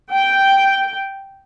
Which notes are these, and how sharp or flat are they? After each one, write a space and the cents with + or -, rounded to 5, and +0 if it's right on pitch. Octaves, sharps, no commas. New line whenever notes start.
G5 -5